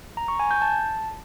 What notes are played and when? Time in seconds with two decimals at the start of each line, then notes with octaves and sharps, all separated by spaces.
0.17 A#5
0.28 C#6
0.39 G#5
0.51 G6
0.62 A5